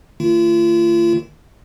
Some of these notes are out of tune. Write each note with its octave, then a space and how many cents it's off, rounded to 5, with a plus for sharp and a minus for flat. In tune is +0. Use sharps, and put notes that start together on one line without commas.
D#3 -5 A3 +40 F4 -35